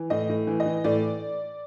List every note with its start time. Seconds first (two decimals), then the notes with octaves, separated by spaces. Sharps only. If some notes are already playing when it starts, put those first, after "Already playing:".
Already playing: E3
0.10 A2 D#5
0.29 A2
0.47 E3
0.60 D#5
0.66 E3
0.84 A2 D5